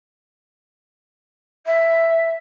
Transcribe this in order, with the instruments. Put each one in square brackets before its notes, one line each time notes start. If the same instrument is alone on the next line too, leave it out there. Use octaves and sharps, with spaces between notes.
[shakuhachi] E5